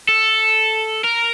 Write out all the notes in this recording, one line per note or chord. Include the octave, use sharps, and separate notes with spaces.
A4
A#4